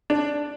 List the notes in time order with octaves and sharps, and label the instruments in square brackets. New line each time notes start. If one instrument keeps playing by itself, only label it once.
[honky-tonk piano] D4